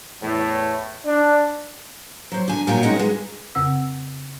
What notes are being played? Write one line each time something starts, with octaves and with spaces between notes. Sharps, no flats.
E2 A2
D4
F#3 C5
D3 G#5
A#2 F#3 C#5 G5 G#5
G#3 C#4 D#4 C#5 D#5 F#5
E3 G#3
F2 C#3 C4 F#5 E6